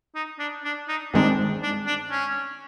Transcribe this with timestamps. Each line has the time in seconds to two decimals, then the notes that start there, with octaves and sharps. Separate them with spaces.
0.15 D#4
0.39 D4
0.64 D4
0.88 D#4
1.13 G2 D#3 G#3 C4 D4 D#4
1.63 D4
1.87 D4
2.11 C#4